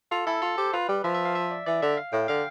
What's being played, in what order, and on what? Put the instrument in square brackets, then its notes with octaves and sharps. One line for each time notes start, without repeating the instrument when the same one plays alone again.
[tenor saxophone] F4 [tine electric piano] A4
[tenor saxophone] E4 [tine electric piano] A4
[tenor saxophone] F4 [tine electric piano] A4
[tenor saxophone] G4 [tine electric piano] C5
[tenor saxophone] F4 [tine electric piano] B4
[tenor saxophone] G3
[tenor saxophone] F3 [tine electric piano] E5
[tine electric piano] E5
F5
E5
D5
[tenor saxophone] E3 [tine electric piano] D5
[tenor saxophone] D3 [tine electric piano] E5
[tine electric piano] F5
[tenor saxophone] A2 [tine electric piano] G5
[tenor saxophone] D3 [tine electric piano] F5